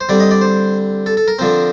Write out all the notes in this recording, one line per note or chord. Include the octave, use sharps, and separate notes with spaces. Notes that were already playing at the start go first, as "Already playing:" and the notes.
C5
D3 G3 C4 D5
D#5
D5
C5
A4
A4
A#4
D3 F3 C4